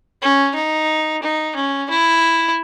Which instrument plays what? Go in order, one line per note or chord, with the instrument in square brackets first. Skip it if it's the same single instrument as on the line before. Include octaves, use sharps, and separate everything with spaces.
[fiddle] C#4
D#4
D#4
C#4
E4